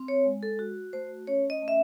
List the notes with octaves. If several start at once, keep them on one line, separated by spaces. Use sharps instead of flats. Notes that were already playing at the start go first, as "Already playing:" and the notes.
Already playing: C4
C#5
G#3
A4
F#4
A3 C5
C#4 C#5
D#5
A3
E5